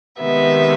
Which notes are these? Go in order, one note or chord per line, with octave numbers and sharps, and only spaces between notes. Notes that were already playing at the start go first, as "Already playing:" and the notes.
C3 D#3 G#3 B3 E5